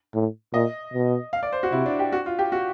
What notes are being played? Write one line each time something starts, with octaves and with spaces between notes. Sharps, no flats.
A2
A#2 D#5
B2
F5
D5
C5
F#4
C3 E4
D4
G4
F#4
F4
G4
F#4